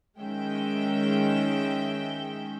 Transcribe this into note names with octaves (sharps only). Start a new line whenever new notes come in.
D#3 G#3 C#4 E5 G5